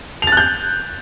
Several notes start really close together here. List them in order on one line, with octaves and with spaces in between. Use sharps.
F7 A6 F#6 G6